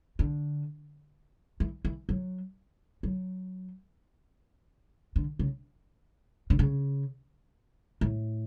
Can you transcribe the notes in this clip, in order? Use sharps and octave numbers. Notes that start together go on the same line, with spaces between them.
D3
E3
E3
F#3
F#3
D3
C#3
D3
C#3
A2